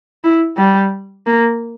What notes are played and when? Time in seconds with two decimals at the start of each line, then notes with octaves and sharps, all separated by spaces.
0.24 E4
0.57 G3
1.27 A#3